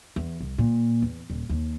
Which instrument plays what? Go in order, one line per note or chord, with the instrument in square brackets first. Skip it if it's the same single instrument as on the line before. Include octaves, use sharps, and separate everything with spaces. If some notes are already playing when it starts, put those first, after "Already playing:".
[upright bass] E2
C2
A#2
E2
D#1
D#2